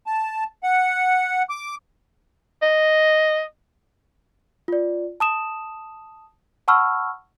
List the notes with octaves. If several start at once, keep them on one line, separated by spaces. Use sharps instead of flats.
A5
F#5
D6
D#5
F4 D5
A5 D#6 E7
F#5 A5 B5 C#6 E6 F6